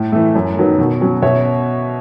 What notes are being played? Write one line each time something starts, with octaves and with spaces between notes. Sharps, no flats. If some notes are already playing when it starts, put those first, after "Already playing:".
Already playing: A2
E3 A3
F#2
D#3 F#3 B3
B2
F#3 C#4
B2 C#5 E5